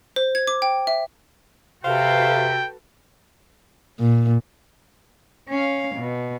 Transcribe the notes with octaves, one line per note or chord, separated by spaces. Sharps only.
C5
G#6
D6
G5
E5
C3 F#4 A4 B4 C5 F5 G5
A#2
C#4 F5
B2